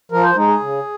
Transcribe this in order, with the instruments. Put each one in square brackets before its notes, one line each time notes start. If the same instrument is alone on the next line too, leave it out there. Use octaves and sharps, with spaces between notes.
[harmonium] F3 A#4
C5
G#3 D#4
G#4
C#3